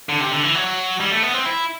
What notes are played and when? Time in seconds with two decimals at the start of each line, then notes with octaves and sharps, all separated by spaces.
0.09 D3
0.20 C3
0.31 D3
0.43 E3
0.55 F#3
1.00 G3
1.11 A3
1.23 B3
1.34 C4
1.45 E4